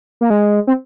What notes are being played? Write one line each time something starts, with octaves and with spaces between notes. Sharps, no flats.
A#3
G#3
C4